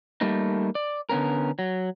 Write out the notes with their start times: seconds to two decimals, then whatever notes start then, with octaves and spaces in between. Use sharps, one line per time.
0.21 G3 A3 A#3 D#4
0.75 D5
1.09 D3 B3 C#4 A#4
1.59 F#3